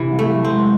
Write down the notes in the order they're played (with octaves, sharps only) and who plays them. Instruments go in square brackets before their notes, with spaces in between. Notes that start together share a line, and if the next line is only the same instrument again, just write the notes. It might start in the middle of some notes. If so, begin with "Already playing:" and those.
Already playing: [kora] C3 E3
[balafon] G3
[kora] A3
[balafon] F#3
[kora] C4
[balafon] G#3